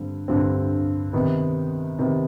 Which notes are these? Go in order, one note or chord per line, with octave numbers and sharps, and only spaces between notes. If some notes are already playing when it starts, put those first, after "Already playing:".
Already playing: G2 D3 G3 C4
G2 D3 G3 C4
C3 D#3 B3
C3 D#3 B3